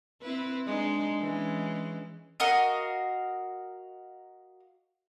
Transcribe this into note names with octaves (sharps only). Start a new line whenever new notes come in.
C4 E4 B4
G#3 D4 D#4
E3 G#3 C#4
F#4 A#4 D#5 F5